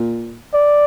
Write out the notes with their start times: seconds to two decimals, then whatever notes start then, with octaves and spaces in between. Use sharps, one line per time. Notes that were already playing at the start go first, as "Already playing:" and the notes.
Already playing: A#2
0.54 D5